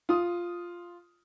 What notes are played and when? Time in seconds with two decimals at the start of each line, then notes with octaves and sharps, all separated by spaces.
0.09 F4 D#6